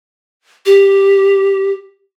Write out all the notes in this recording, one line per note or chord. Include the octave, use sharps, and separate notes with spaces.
G4